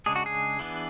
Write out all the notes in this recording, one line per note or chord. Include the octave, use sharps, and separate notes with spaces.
C#3 G#3 D4 G#4
F#4
G#4
E3 B3 D4